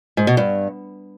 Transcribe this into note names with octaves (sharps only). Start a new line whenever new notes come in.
G#2
B2
G2